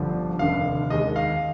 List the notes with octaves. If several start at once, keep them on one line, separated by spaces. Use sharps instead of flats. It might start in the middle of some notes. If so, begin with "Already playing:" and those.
Already playing: G1 G2 D3 F3
F1 D#2 D3 F5
D#2 D#3 G#3 D#5
F5